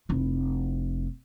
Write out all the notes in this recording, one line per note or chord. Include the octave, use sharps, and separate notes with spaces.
F1 E4